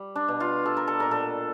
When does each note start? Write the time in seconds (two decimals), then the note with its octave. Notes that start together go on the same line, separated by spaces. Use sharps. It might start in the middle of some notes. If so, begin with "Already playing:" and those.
Already playing: G3
0.15 D4
0.28 B2
0.40 F4
0.65 G3 A4
0.77 A#4
0.88 A4
1.00 A#2 A#4
1.11 A4